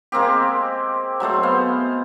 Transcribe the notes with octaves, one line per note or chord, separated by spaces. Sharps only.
G#3 A#3 C4 G4
F#3 G#3 A3 C5
B3 C5 F5